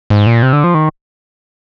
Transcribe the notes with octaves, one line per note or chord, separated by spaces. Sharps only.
G#2
A#2
C3
D3
F3
D#3